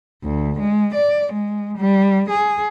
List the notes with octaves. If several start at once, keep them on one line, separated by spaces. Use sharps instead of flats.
D2
G#3
D5
G#3
G3
G#4